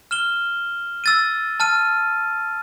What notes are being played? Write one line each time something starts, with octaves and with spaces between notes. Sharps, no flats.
F6 E7 G7
E6 A6 D#7
A5 F6 D#7